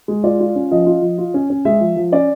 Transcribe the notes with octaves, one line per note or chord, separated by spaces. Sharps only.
G#3
F4 D5
F4
C#4
F3 D#5
F4
F3
F4
C#4
C#4
G#3 E5
F3
F3
C#4 D5